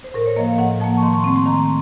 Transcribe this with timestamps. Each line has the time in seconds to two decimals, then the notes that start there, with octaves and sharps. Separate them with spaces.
0.04 C5
0.14 A2 A#4
0.26 C#5
0.36 F3 A#3 D#5
0.47 F5
0.58 A2 F#5
0.80 F3 A#3 A5
0.97 C#6
1.02 D#3 C6
1.14 C#6
1.24 A3 C4 C#6
1.36 C6
1.46 D#3 A#5
1.58 A#5